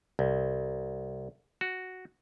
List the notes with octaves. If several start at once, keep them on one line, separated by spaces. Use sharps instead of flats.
C2
F#4